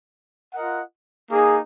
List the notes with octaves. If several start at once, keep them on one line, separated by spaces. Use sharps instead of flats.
F4 A#4 D#5 F#5
A#3 D#4 G#4